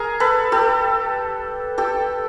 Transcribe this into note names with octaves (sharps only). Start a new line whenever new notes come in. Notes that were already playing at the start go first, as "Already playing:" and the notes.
Already playing: G#4 A#4
A4 B4
G4 A4
G4 A4